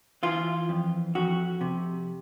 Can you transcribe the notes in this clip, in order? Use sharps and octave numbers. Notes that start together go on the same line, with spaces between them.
E3 F4
F2
F2 F#4
C3